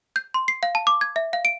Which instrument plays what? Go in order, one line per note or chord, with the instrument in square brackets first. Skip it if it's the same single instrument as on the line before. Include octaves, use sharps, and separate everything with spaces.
[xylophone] G6
C6
C7
F5
A5
D6
G#6
E5
F5
D7